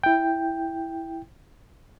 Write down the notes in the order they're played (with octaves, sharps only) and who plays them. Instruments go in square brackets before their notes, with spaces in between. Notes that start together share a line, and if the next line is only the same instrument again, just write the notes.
[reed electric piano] E4 G5